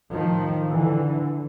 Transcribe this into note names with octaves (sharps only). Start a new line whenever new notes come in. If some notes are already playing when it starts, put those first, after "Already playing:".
A2 D#3 F3
D3 E3